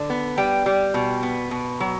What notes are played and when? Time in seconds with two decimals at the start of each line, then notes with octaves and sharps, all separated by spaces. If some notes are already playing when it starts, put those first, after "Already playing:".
Already playing: D3
0.10 B3
0.38 G3 G5
0.66 G3
0.94 B2
1.23 B3
1.51 B2
1.80 F#3